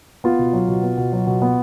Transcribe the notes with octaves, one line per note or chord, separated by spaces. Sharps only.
B3 F4
B2
F#3
B2
B3
B2
F#3
B2
B3